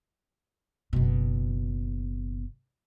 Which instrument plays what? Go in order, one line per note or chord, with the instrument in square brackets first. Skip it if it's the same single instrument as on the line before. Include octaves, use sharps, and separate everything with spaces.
[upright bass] F#1 B2